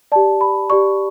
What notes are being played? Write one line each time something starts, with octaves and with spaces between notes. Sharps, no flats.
G4 D5 A5
B5
G4 D5 C#6